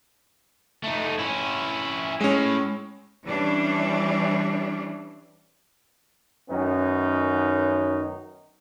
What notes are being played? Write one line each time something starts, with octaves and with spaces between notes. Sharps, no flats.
A3 D#4
C#4 E4
A2 G#3 C#4
E3 G3 C#4 D4
F#2 D#3 B3 C#4 D#4